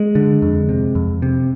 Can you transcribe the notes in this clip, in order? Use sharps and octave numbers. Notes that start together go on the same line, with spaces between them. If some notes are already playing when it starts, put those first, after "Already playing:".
Already playing: G#3
D3
F2
C3
F2
C3